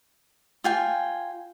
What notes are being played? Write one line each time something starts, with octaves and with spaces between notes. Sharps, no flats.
F4 G5 G#5